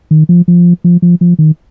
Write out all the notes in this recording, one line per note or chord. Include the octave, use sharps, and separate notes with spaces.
D#3
F3
F3
F3
F3
F3
D#3